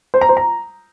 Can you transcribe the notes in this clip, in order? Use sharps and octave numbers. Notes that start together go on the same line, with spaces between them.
C5
A#5
C5
A#5